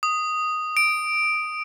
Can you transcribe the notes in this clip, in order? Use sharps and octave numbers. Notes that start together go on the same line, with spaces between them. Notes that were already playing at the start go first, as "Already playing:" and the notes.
D#6
D7